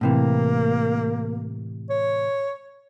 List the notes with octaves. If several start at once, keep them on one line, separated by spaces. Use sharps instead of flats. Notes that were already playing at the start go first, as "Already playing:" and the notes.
A2 C3 E3 A#3
C#5